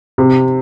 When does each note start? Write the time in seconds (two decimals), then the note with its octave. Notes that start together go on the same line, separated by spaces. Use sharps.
0.18 C3